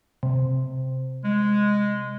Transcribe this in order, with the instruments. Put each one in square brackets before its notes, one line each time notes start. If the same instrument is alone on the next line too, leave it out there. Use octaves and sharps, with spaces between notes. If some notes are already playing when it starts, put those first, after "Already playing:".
[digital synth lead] C3
[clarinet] G#3